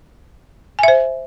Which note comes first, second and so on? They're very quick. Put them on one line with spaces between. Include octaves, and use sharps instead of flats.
G#5 E5 C5